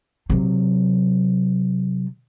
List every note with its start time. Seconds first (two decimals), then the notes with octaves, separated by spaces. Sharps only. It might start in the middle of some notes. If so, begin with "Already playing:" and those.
0.30 C3 F#3